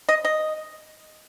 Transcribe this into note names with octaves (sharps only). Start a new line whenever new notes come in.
D#5
D#5